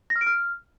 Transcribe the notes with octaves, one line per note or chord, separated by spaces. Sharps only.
A#6
F6
D7
F6